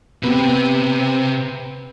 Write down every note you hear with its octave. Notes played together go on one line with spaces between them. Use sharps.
C3 B3